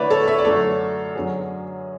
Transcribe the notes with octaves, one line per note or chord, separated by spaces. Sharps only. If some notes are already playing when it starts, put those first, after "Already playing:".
Already playing: D3 A3 E4 B4 C#5 D5 E5
A4 C#5
C#5 E5
D5
F#2 D3 A3 D4 A4 C#5
F#2 D3 F#3 G#4